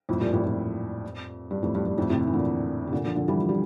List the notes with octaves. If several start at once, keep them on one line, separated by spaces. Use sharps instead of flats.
F2 A2
G2 A#2
F2 A2
F2
G2
F2 A2
G2
G2
F2 A2
A2 C3
E3
A#2 D3
C3
A#2 D3
D3 F3
D3 F3
E3 G3
F3
G3